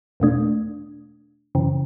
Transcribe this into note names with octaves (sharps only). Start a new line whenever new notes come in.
E2 B2 A3 D4
F#2 C#3 E3